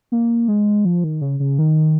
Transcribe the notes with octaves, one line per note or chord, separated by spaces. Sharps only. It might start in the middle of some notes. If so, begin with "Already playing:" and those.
A#3
G#3
F3
D#3
C#3
C#3
D#3